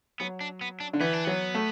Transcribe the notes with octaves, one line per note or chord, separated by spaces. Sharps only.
F#3 B3
D4
B3
D4
D3
E3 B3
D4
F#3 B3
A3